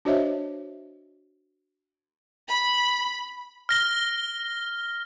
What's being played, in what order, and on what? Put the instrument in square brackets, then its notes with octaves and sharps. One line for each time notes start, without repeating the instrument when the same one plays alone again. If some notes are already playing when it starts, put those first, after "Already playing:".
[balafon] D4 F#4 C5 C#5 D#5 E5
[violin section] B5
[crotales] F6 A#6 G7